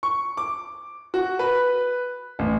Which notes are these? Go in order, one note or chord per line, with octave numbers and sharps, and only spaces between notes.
C#6
D6
F#4
B4
A1